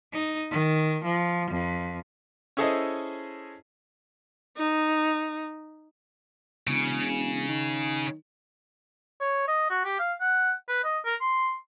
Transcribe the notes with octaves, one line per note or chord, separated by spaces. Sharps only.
D#4
D#3
F3
F2
C#4 E4 G#4 A4 C5 D#5
D#4
E1 C#3
D#3
C#5
D#5
F#4
G4
F5
F#5
B4
D#5
A#4
C6